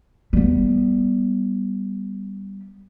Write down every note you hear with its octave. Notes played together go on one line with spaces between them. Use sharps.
G3 B3